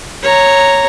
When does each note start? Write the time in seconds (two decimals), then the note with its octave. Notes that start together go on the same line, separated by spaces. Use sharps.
0.22 C#5 A#5